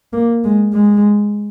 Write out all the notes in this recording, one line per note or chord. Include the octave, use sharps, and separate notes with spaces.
A#3
G#3
G#3